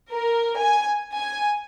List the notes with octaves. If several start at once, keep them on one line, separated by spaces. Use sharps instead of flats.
A#4
G#5
G#5